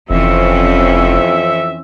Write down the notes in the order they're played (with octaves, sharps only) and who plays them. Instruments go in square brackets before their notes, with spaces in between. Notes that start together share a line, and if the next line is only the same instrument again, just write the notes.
[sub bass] F1 [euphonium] F2 [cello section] E3 C4 C#4 [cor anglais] E5